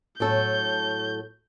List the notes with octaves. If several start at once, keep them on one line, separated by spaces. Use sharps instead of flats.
A2 F#3 A4 G6